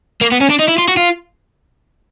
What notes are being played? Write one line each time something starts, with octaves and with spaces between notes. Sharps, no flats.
A#3
B3
C#4
D4
D#4
E4
F4
F#4
F4